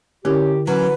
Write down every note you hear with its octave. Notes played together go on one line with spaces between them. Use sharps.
D3 C#4 E4 G4 A#4
E3 F#3 C#4 B4